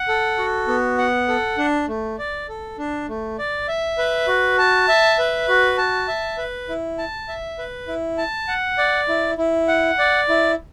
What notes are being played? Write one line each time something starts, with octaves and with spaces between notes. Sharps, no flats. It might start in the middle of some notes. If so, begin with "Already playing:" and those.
Already playing: F#5
A4
F#4
B3
F#5
A4
D4
A3
D5
A4
D4
A3
D5
E5
B4
F#4
A5
E5
B4
F#4
A5
E5
B4
E4
A5
E5
B4
E4
A5
F#5
D5
E4
E4
F#5
D5
E4